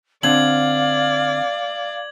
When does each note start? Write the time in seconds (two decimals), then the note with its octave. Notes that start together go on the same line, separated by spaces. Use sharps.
0.23 D3 C4 D5 F5 G#6 F#7